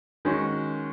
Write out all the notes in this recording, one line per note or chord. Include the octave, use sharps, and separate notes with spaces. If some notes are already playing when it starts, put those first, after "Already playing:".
D#3 G#3 C#4 F#4